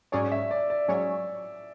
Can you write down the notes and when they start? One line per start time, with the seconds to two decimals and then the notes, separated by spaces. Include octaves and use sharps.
0.12 G#2 F#3 C#4 G#4 C#5 D5
0.32 E5
0.51 D5
0.70 D5
0.88 G#2 F#3 C#4 G#4 C#5